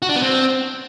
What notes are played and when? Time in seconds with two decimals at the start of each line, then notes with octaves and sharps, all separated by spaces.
0.02 F#4
0.09 D4
0.16 B3
0.23 C4